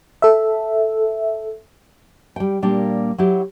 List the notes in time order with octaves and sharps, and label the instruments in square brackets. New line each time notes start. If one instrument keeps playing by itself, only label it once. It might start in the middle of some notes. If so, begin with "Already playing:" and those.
[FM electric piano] A4 E5
[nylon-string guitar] G3 G5
A#2 G3 A#3 D4
F#3 E4 G4